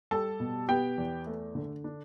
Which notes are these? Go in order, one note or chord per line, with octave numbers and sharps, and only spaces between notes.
G3 A4 A5
B2
B3 G4 G5
E2
A3
D3
D4